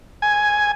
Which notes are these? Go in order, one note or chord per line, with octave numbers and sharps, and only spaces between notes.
G#5